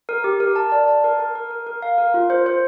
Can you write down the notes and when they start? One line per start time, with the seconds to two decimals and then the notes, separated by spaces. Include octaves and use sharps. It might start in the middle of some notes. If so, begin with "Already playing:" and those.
0.09 A#4
0.24 G4
0.40 A#4
0.56 A5
0.72 D5
0.88 A5
1.04 A#4
1.20 A#4
1.35 A#4
1.51 A#4
1.67 A#4
1.82 F5
1.98 A#4
2.14 F4
2.30 C5
2.46 C5